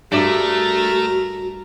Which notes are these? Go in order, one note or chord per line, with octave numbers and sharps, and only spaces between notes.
G2 A3 F#4 A#4 D5 E5